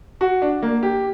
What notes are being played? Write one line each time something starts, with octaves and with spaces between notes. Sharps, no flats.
F#4
D4
A#3
G4